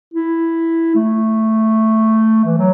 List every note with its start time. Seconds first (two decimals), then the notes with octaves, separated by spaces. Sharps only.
0.14 E4
0.95 A3
2.45 E3
2.58 F#3